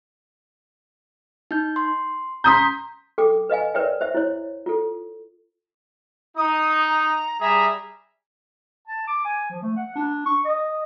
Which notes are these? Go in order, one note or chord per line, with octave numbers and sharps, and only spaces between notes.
D#4 G6
C6
A#5 C6 D#6 G6 B6
A4 G5 D6
B4 D#5 F5 G#5
A#4 B4 C#5 D5 E5 G5
C5 E5
E4 C#5
F4 A4
D#4 D#6
A#5
G3 G#4 E5 A#5
A5
D6
G#5
F3
A3
F#5
D4
C#6
D#5